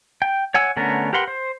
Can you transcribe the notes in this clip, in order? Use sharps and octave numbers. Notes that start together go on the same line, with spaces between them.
G5
C#5 F#5 G#5 E6
D3 A3 B3 C#4 A#4
G4 A#4 B4 F#5 C6
C5